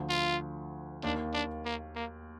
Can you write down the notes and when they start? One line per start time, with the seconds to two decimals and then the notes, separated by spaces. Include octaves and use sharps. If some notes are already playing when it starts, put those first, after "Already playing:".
Already playing: D2 D3 F3
0.10 F4
1.03 D#2 D#3 A#3 D4
1.34 D4
1.66 A#3
1.96 A#3